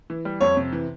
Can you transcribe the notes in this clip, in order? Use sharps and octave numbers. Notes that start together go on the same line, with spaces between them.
E3
G3
F2 C#5
C3
E3